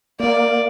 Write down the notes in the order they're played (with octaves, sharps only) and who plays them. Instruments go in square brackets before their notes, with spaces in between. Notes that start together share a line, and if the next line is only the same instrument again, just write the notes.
[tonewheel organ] A#3 [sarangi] D5